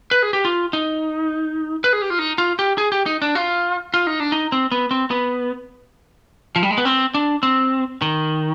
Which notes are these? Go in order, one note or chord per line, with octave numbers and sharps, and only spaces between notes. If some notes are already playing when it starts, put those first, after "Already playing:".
B4
G#4
G4
F4
D#4
B4
G#4
G4
F4
D#4
F4
G4
G#4
G4
D#4
D4
F4
F4
D#4
D4
D#4
C4
B3
C4
B3
F3
G3
G#3
B3
C4
D4
C4
D#3